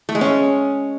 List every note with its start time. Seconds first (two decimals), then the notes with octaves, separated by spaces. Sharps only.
0.09 A3
0.15 G#3
0.21 C#4